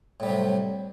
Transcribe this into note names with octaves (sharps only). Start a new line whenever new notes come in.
A2 C3 F#3 G3